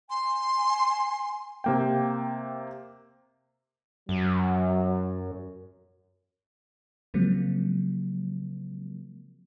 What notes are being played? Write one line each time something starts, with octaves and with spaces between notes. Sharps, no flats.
G#5 C6
C3 A#3 G5
F#2 F#3
C#3 F3 F#3 G#3 A#3 C4